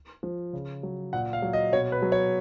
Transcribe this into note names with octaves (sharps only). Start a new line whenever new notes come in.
F3
C#3
F#3
A#2 F#5
F5
F#3
D#5
B2 C#5
B4
F#3
C#5